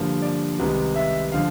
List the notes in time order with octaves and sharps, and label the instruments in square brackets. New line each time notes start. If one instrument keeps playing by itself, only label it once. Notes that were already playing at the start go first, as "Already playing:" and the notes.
Already playing: [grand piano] G2 D3 F3 A#3
D5
C2 C3 D#3 G#3 B3
E5
D3 F3 F5